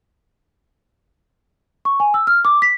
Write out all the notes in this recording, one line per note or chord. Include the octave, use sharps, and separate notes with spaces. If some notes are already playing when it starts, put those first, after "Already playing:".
C#6
G#5
E6
F6
D6
B6